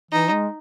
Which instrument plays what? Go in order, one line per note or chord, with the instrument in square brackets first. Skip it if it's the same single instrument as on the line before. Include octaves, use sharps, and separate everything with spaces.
[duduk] E3 [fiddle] D#4
[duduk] G#3